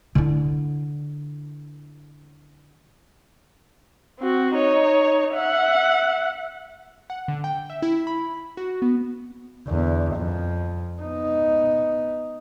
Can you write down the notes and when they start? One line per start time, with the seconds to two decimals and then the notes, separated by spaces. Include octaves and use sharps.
0.15 D3 E4
4.20 C4 F#4
4.54 D#4 C#5
5.34 E5 F#5
7.10 F#5
7.28 D3
7.44 G5
7.70 E5
7.82 E4
8.07 B5
8.57 F#4
8.82 B3
9.67 E2 D3
10.15 F2 F3
11.01 B3 D#4